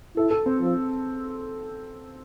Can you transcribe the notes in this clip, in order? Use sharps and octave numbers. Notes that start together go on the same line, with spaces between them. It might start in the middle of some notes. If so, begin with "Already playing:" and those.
E4 A4
A4
C4
F3